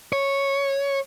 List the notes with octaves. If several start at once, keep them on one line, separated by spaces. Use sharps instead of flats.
C#5